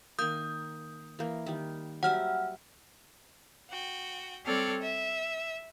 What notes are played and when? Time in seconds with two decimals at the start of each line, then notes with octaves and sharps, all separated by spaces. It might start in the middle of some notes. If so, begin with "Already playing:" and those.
0.19 D#3 A#3 D#6 G6
1.19 E3 A#3
1.47 D#3 G3
2.03 F#3 G3 E5 F#5 F6
3.70 F#4 G5
4.45 G3 C4 A4 C#5 D5 F6
4.82 E5